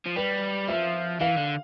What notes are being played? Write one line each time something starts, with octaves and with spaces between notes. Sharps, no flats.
F3
G3 B4
F3 E5
E3 F5
D3